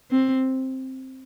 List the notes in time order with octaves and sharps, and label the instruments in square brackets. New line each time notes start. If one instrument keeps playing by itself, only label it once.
[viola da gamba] C4